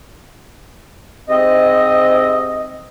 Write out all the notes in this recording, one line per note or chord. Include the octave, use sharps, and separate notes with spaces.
G#2 C3 C4 D#5